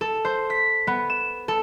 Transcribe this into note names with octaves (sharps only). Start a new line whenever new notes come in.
A4
C5
B6
B3
E7
A4